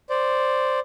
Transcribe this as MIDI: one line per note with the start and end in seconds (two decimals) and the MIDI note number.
0.10 0.80 72
0.10 0.80 74